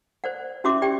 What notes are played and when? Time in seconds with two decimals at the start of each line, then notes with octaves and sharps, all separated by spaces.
0.24 C5 D5 F#5
0.64 C#4 E4 F#4 E5 C6 D6
0.82 G4 D5 G5